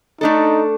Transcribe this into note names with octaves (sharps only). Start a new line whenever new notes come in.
A3 D4 D#4 A4